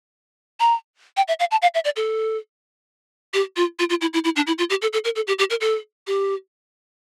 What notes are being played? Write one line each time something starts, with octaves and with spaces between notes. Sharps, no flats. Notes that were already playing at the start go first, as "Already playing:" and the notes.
A#5
G5
E5
F5
A5
F5
E5
D5
A4
G4
F4
F4
F4
E4
E4
E4
D4
E4
F4
G4
A4
A4
A#4
A4
G4
G4
A#4
A4
G4